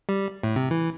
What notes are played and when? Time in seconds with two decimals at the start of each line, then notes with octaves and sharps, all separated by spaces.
0.09 G3
0.43 A2
0.56 C3
0.71 E3